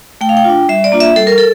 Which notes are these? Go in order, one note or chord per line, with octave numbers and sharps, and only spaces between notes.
A3 G5
F5
G5
D4 F4
G3 E5
D5
A#3 D4 F4
E5
G3 A4
A#4
A4